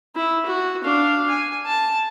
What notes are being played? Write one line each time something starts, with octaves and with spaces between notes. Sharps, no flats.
E4
F#4
D4 F5
G#5
A5